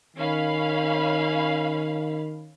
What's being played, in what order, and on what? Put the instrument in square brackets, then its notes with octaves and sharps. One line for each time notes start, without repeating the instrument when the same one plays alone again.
[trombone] D#3 [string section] C#4 F5 B5